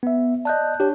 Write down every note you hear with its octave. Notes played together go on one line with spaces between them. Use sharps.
B3 E5
D5 D#5 A5 F#6 G6
D4 G4 C#5 A5